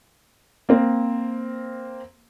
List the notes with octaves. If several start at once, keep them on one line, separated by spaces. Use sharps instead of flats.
A#3 C4